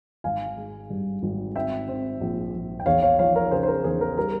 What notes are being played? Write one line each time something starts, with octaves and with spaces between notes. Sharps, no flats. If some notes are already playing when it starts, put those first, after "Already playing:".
G#1 F5 G#5
G#3
G2
G#1
C4 E5 G5
C4
A#1
A#1
G5
E2 C#5 F5
C#5 F5
F3 C#5 F5
A#4 C#5
C#3 G#4 C5
C5
A#4
E2 G#4
A#4
G3 A#4